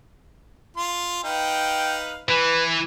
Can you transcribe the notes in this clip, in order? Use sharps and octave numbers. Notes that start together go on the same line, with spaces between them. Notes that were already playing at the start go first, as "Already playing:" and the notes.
F4 C6
D#4 B4 F5 G5
E3 B4